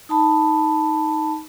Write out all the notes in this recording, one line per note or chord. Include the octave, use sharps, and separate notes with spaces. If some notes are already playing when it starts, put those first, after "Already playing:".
D#4 A5 B5